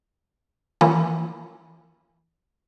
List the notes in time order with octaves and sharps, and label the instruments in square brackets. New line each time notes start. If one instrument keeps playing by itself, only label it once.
[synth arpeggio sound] E3 F3 A#3 C#4